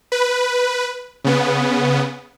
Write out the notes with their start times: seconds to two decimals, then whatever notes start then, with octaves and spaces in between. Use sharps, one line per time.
0.12 B4
1.24 C#3 B3